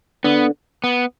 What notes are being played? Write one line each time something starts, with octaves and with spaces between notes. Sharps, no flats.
D3 B3
B3